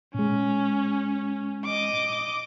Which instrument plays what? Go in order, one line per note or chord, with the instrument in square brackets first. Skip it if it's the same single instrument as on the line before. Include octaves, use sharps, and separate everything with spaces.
[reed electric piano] A#2 G#3 [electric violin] C#4
[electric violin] D#5 D6